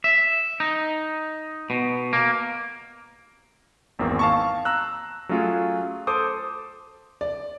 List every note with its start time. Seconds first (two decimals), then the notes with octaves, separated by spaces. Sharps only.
0.04 E5
0.60 D#4
1.70 B2
2.13 A#3
3.99 G#1 E2 A#3 C4
4.19 F5 A5 C#6
4.65 A#5 E6 F#6
5.29 F#3 A3 C#4 F4 G#4
6.07 A4 C5 D6 D#6
7.21 D5